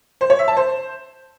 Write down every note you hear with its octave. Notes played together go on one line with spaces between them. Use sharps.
C5
C#5
E5
A5
C5